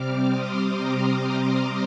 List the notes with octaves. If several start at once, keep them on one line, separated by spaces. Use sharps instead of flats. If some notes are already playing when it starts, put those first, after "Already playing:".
Already playing: C3 G3 C4 D6 F6
C6 D#6
A#5 D6
C6 D#6
C6 D#6